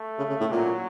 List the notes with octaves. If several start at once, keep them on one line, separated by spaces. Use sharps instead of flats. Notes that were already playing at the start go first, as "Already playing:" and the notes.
Already playing: A3
C#3
C#3
A2
A#2 F#3